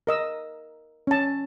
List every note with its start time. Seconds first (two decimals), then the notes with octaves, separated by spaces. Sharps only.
0.07 A#4 D#5 E6
1.07 C#4 A5